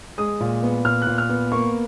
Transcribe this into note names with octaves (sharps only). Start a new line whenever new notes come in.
G#3 D#6
A#2
B3
A#2 F6
A#2 F#6
F6
B3
A#3 C#6